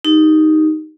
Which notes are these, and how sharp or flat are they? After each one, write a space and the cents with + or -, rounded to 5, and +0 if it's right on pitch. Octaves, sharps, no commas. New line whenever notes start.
D#4 +0 G4 +0